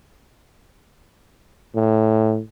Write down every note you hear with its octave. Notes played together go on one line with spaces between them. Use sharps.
A2